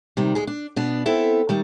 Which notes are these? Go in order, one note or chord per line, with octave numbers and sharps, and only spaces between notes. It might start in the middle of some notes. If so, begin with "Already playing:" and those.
C3 D#3 G3
D2 G#3 G#4
D4
B2 B3 D4
B3 C4 E4 A4 E5
D#3 G3 A3